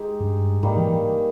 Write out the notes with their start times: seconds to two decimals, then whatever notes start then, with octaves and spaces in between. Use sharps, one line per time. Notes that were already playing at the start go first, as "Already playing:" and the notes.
Already playing: G#3 D#4 G4
0.20 G2
0.63 G#2 D#3 G3 A#3
0.77 E3